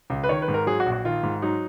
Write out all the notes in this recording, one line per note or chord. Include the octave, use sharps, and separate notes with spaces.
C#2
B4
D#3 C#5
B4
G#2
A#4
F#3 G#4
F#4
A#1
F#4
D#3 F4
G#2
F#3 D#4